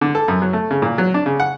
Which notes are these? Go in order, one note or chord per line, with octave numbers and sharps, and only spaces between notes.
D3
A4
F#2
F#3
A3
C#3
A#2
F#3
D4
C#3
F#5